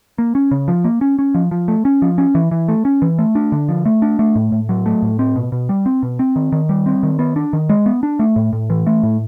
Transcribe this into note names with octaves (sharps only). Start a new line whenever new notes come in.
A#3
C#4
C#3
F3
A#3
C#4
C#4
F3
F3
A3
C#4
F3
C#4
E3
E3
A3
C#4
E3
A3
D4
D3
F3
A3
D4
A3
A2
A2
F#3
A3
A2
C4
B2
B2
G3
C4
B2
C4
D#3
D#3
G3
C4
D#3
B3
D4
D#3
G#3
B3
D4
A3
A2
A2
E3
A3
A2